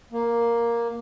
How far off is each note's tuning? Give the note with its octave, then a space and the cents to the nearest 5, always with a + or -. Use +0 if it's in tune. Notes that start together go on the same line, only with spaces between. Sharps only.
A#3 +5